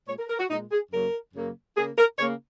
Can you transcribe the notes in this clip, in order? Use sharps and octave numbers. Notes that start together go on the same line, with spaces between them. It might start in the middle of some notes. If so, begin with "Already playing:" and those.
A#2 G#3 C#5
A#4
A#4
F#4
A#2 G#3 D#4
G#4
F#2 C#3 F#3 A#3 A#4
F#2 C#3 F#3 A#3
C#3 A#3 G#4
A#4
C#3 A#3 C#5